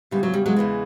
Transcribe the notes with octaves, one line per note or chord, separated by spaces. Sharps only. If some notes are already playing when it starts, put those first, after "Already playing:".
E2 C#3 E3 G3
F#3
G3
F#3 G#3
E2 C#3 E3